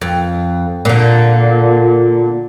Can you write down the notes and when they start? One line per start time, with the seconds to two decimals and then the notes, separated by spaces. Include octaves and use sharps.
0.01 F2
0.85 A#2 D3